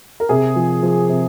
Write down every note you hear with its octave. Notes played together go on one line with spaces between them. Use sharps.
A#4
C3 G#4
F3
F3
C3